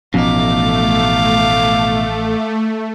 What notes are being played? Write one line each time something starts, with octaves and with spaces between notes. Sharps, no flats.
A1 B2 F3 A3 C#4 D#4 F5 D6